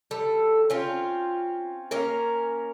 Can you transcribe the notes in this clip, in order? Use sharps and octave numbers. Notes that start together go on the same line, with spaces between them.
G3 A4
C4 C#4 F4
A#3 C#4 A#4